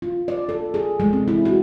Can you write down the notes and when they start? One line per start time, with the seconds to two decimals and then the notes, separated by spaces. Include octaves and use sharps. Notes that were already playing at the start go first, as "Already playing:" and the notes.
0.02 F4
0.28 D5
0.49 A4
0.74 G#4
1.00 G#3
1.13 C4
1.28 E4
1.45 F#4